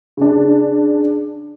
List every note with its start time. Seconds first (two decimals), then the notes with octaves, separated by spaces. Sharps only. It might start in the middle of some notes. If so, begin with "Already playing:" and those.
0.17 C#3 D4